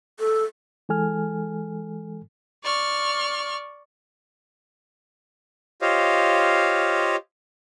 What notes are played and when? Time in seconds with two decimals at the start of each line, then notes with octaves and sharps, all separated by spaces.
0.19 A4
0.89 E3 G#3 A4 G#5 F6
2.63 D5 C#6 F6
5.82 F4 G4 C5 C#5 D#5 F5